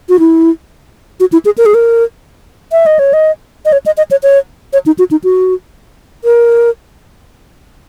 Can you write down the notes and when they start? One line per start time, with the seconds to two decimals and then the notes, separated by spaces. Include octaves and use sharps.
0.09 F#4
0.19 E4
1.20 F#4
1.32 E4
1.45 G#4
1.58 A#4
1.66 G#4
1.74 A#4
2.72 E5
2.86 D#5
2.99 C#5
3.13 D#5
3.65 D#5
3.72 C#5
3.86 D#5
3.97 D#5
4.11 C#5
4.23 C#5
4.73 C#5
4.86 D#4
4.99 F#4
5.11 D#4
5.24 F#4
6.24 A#4